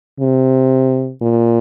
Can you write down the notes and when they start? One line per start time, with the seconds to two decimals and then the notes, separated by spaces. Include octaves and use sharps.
0.21 C3
1.21 A#2